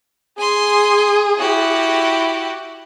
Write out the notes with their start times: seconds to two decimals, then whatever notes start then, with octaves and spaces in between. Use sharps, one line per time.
0.38 G#4 G#5 C6
1.39 E4 F#4 G4